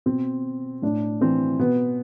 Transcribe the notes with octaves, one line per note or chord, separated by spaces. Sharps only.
B2 C4
A2 D4
E3 C4
B2 B3